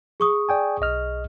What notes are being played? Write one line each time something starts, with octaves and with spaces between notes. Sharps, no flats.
G#4 C#6 D#6
D5 G5 G#5
B1 D#5 F6